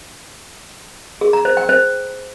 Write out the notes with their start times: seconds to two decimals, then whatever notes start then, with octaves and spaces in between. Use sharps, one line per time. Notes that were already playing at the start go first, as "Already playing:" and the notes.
1.21 G#4
1.33 A#5
1.45 C5
1.57 G5
1.69 C5